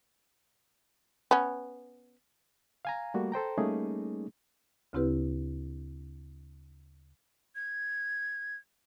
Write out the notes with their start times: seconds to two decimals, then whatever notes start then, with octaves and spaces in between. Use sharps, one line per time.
1.31 B3 C#4
2.85 F5 G#5 A#5
3.14 G3 A3 A#3 F#4
3.32 A4 C5 G5 A#5
3.58 G3 A3 A#3 C#4 D#4 G#4
4.93 D2 C#3 C4 E4 G4 B4
7.55 G#6